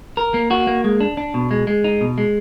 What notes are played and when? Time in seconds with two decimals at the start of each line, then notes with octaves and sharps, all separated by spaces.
0.17 A#4
0.34 A#3
0.51 F#4
0.67 A#3
0.84 G#3
1.01 D4
1.17 D4
1.34 B2
1.51 G#3
1.67 G#3
1.84 D#4
2.01 B2
2.18 G#3